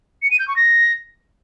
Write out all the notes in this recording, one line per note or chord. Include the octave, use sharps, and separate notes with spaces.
C#7
D#7
G6
C#6
A#6